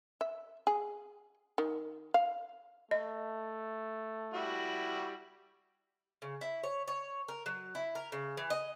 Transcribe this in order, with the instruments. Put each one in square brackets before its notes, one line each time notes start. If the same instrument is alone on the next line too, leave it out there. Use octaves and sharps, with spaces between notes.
[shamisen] E5
G#4
D#3
F5
[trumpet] A3 [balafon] D#5
[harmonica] G3 E4 F#4
[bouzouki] C#3
E4
C#5
C#5
A#4
F#3
E4
A#4
C#3
E3
D#5